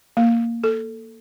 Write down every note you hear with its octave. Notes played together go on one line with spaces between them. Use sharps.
A#3
A4